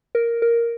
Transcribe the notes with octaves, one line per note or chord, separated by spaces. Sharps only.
A#4
A#4